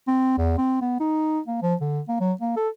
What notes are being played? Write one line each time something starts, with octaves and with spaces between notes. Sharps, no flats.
C4
E2
C4
B3
D#4
A#3
F3
D3
A#3
F#3
A#3
A4